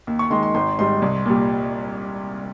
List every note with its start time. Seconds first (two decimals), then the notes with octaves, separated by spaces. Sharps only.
0.07 D#2
0.19 C#6
0.30 D#3 G#3 C6
0.43 C6
0.55 G#1 C6
0.79 G#2 G3 C6
1.02 C2
1.25 A#2 G3